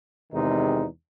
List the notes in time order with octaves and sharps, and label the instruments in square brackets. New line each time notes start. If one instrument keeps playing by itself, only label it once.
[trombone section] E2 C3 D#3 G#3 D#4